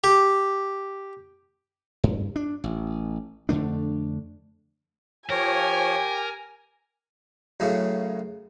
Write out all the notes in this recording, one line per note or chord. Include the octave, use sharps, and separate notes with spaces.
G4
G2
D4
A1
F2 D3 A3 D4
F3 G4 A#4 C#5 G#5
F#2 A2 C#3